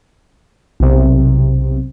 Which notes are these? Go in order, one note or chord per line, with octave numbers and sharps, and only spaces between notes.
B1 C3